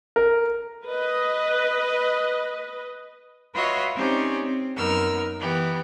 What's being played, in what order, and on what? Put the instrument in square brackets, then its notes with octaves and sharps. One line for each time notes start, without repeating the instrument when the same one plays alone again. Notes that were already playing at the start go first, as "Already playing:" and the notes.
[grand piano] A#4
[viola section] B4 D#5
[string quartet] F4 F#4 B4 C#5 D#5 E5
C4 C#4 D#4 G4 C5 D5
C4
F#2 B3 D#4 A#4 E6 F6
E3 B3 G4